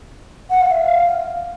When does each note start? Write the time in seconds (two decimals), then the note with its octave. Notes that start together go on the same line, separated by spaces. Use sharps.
0.50 F#5
0.61 F5
0.70 E5
0.81 F5